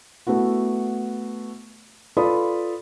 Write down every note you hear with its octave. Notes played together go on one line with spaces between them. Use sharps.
A3 B3 E4 F#4
F4 A4 B4 D5 B5 D#6